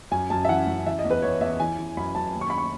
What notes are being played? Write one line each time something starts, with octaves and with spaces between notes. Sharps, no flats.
F#2 G#5
F#2 A5
E5
E3 F#5
F#2
E3 E5
D#5
E2
B4
E2 C#5
E2 E5
E3 G#5
E3
F#2 B5
F#2 A5
D#2
C#6
B5
C#6